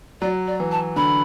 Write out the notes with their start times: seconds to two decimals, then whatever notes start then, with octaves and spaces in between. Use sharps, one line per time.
0.21 F#3 D5
0.47 D5
0.60 E3
0.72 A5
0.96 D3 B5